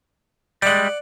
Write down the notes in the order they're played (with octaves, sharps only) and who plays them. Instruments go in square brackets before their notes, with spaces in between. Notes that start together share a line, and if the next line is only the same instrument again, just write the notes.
[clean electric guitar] G3 G#3 [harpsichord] D5 F#5